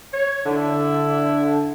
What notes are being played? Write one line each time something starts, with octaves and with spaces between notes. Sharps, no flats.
C#5
D3 E4